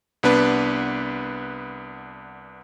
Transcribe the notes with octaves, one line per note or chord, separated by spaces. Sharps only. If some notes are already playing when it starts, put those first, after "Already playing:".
C2 B3 D4 B4